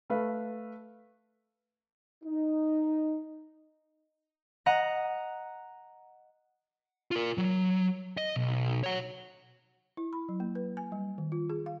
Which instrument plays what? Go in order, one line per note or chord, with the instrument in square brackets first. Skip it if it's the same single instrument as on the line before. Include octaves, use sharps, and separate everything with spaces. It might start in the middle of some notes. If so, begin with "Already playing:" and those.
[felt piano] A3 B4 F5
[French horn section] D#4
[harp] D#5 F#5 A#5
[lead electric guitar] F4 A#4
F#3
D#5
B1
C#5 F#5
[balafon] E4
B5
F#3
A#3
B4
G#5
G3
D#3
F4
G#4
F5